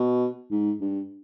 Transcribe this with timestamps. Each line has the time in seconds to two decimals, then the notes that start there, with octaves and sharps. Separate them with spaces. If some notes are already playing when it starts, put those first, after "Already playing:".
Already playing: B2
0.51 G#2
0.81 G2